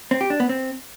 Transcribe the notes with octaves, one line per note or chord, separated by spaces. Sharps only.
C4
G4
D4
B3
C4